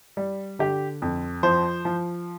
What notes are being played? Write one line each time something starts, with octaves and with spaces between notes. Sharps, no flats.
G3
D3 G4
F2
F3 C5
F3